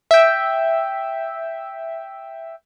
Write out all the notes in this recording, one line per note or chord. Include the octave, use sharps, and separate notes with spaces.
E5 G5